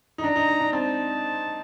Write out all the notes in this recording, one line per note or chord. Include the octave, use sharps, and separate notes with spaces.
D#4
D4 A#5
D#4
D#4
D4
C4 A5